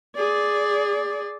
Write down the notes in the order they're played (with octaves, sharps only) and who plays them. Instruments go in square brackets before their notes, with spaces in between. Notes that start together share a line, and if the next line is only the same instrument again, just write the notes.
[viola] G#4 D5